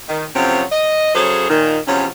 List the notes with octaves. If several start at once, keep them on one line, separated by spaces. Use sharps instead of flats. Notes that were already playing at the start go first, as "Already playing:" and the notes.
D#3
A2 C3 F3 F#3 C4 C#4
D#5
C#3 F#3 C#4 G#4 A4 C5
A#2 D#3
E2 C3 F3 F#3 C#4